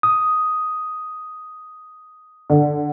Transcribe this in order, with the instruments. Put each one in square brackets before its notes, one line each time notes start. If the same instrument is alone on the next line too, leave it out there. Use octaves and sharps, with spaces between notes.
[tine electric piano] D#6
[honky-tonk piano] D3